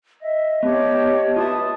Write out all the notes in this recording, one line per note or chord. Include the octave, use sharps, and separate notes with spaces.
D#5 E5
B3 G4 C#5 A5
F4 B4 E5 A5 D#6